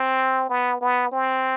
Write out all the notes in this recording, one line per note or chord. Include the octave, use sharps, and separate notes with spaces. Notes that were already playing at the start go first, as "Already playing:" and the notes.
Already playing: C4
B3
B3
C4